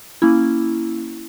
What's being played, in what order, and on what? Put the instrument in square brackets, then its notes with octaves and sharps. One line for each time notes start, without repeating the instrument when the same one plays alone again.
[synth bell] A#3 C#4 E4